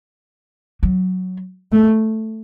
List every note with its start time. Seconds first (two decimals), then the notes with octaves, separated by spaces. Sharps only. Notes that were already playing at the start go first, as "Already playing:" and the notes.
0.83 F#3
1.72 A3